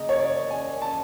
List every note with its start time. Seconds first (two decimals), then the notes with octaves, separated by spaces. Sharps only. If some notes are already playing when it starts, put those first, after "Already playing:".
Already playing: C#3 A#3 D#5
0.09 C#5
0.20 D5
0.51 G#5
0.82 A5